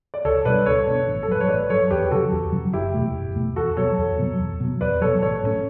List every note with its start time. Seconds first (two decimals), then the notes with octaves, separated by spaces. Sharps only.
0.14 D5
0.25 C#2 A4 C#5
0.45 B2 G3 D4 B4 D5
0.66 C#2 A4 C#5
0.87 B2 G3 D4
1.07 A1
1.23 A4
1.28 G2 F#3 B4
1.40 C#5
1.49 A1 B4 D5
1.70 G2 F#3 A4 C#5
1.90 E2 G4 B4
2.04 G4
2.11 C#3 F#3 F#4 A4
2.32 E2
2.52 C#3 F#3
2.73 F#1 E4 G4
2.94 E2 B2 A3
3.15 F#1
3.36 E2 B2 A3
3.56 E2 F#4 A4
3.77 B2 F#3 A4 C#5
3.98 E2
4.19 B2 F#3
4.39 E2
4.60 B2 F#3
4.81 E2 B4 D5
5.01 B2 F#3 A4 C#5
5.22 A1 A4 C#5
5.43 A2 F#3 C#4